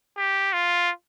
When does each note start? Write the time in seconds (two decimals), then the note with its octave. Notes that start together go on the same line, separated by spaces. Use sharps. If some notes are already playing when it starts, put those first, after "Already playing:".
0.17 G4
0.53 F4